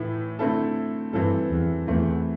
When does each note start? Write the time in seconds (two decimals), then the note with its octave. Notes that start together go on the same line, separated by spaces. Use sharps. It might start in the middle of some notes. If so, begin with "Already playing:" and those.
Already playing: A2 E3 A3 E4
0.39 D3 A3 C4 E4 A4
1.13 G2 E3 C4 A4
1.50 E2
1.87 E2 E3 A3 C4